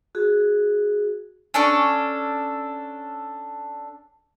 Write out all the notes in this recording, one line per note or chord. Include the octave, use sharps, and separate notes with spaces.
F#4 G#4
C#4 D4 A4 C#6